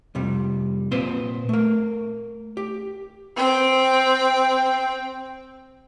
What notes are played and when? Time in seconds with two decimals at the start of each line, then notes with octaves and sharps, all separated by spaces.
0.15 F2 C3 G3
0.91 A#2 C4 B4 C5 C6
1.49 A3 A#4
2.57 G4
3.36 C4 G5